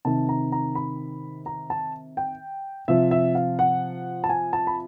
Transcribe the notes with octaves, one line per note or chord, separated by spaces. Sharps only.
C3 D#3 A5
A#5
A#5
B5
A#5
A5
G5
C3 F3 E5
E5
F5
F#5
A5
G#5
A5
B5